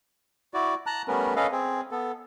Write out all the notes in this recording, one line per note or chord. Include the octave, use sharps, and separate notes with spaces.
E4 F#4 D5
A5 A#5 F#6
G3 A3 B3 C#4 A#4 B4
C#4 A4 B4 D#5 F5
C4 G#4
B3 A4